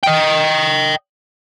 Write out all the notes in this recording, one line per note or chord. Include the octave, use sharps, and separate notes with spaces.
D#5 G5